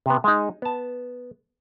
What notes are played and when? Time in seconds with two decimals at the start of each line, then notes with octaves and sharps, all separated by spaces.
0.06 C3 B3
0.24 G#3 D#4
0.62 B3 A5